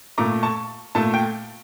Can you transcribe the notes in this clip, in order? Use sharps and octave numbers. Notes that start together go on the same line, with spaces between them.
A#2 A3 A#5 D6
A5 C#6
A#2 A3 A5
G5